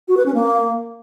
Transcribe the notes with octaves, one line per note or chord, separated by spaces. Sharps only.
F#4
B4
C#4
A#3